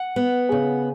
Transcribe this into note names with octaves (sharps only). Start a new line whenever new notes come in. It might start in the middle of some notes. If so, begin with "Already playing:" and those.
Already playing: F#5
B3
C#3